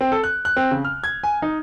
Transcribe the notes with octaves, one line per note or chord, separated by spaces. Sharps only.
C4
A4
F#6
F#6
C4
C#3
F6
G#6
G#5
D#4